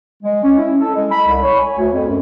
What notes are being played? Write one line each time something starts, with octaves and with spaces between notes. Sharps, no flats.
G#3
C#4
E4
A4
G#3
B5
C2
C#5
G#5
D2
F2
F#2